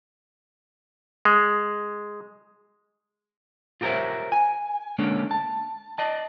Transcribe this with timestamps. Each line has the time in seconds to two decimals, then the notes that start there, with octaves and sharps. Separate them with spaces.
1.25 G#3
3.81 F4 G4 A#4 C5 C#5 E5
4.32 G#5
4.98 D3 G#3 A#3 C#4 D4 C#5
5.31 A5
5.98 D5 D#5 A5